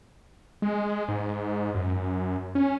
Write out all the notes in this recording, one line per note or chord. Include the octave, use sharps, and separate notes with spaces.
G#3
G#2
F#2
C#4